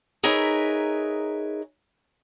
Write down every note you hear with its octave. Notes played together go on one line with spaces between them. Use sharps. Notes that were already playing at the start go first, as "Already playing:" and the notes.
D#4 G#4 A#4 B4 C#5 E5